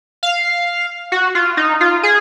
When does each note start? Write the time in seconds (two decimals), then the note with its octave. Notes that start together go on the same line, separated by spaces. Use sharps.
0.23 F5
1.12 F#4
1.35 F4
1.57 D#4
1.81 F4
2.03 G#4